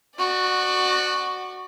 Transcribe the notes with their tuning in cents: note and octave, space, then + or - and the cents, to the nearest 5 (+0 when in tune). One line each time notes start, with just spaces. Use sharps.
F#4 +0 D5 +35